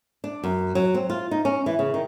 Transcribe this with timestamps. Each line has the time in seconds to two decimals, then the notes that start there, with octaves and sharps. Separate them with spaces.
0.24 D4
0.44 F#2
0.75 F#3
0.94 C4
1.10 F4
1.31 D#4
1.45 C#4
1.66 E3
1.79 C#3
1.94 D#3